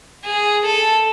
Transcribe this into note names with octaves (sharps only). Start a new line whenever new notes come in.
G#4
A4